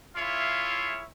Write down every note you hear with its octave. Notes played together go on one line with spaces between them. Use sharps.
E4 F4 G#4 C#5 E5 F5